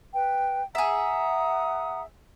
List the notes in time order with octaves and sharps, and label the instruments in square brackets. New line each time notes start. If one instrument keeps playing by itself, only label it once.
[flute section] B4 G5
[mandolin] G#4 E5 [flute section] F#5 A#5 D#6